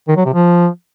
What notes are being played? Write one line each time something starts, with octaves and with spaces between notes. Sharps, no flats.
D#3
F#3
C3
F3